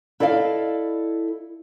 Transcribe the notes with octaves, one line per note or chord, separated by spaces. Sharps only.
E4 A4 D5 D#5 F5